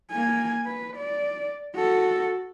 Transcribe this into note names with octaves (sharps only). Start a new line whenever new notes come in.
A#3 G#5
B4
D5
F#4 A4